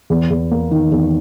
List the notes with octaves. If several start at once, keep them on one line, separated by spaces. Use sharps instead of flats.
E2
E2
A#3
D#3
E2